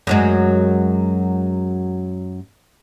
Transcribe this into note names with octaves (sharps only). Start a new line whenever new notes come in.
F#2 F#3 G#3